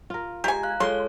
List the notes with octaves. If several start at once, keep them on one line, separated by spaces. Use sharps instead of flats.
F4 A#4
G#3 G4 G#5 A#5
F5 F#6
G#3 F4 A4 C#5 C6